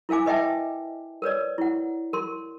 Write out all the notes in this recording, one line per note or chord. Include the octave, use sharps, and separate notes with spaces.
E4 A#4 F5 G#5 D6
B4 D#5 E5 G5 A5
A#4 B4 C#5 D5
E4 F#5
A#4 C6